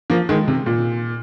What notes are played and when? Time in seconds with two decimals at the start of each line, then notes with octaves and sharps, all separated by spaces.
0.10 F3 A#3
0.29 D#3 G#3
0.48 C3
0.66 A#2